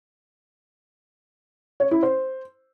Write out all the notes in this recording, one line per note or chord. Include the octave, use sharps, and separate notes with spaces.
C#5
E4
C5